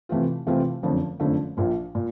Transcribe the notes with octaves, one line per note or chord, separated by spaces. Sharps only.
C3 E3 A3 C4 F4
C3 E3 A3 C4 F4
F#1 F2 D3 F3 A3
F#1 F2 D3 F3 A3
A#1 A#2 F3
A#2